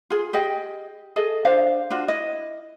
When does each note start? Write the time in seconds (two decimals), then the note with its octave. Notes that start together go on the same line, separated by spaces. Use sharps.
0.10 F4 G#4
0.33 G4 G#4 D#5 G5
1.16 G#4 A4 D#5
1.45 D4 C5 F5
1.90 D4 F4 F#4
2.08 E4 D#5